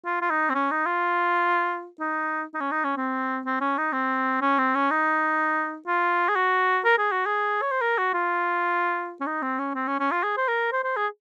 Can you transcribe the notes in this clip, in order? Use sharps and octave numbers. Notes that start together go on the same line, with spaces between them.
F4
F4
D#4
C4
C#4
D#4
F4
D#4
D#4
C#4
D#4
C#4
C4
C4
C#4
D#4
C4
C#4
C4
C#4
D#4
F4
G#4
F#4
A#4
G#4
F#4
G#4
C#5
C5
A#4
F#4
F4
C#4
D#4
C4
C#4
C4
C#4
C#4
F4
G#4
C5
A#4
C5
C5
G#4